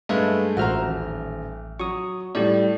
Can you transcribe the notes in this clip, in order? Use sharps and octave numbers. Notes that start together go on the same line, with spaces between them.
G2 G#3 A3 B4 E5 F5
A1 F#4 C5 E5 A#5 F6
D#1
F#3 C#6 D#6
A2 G3 G4 D5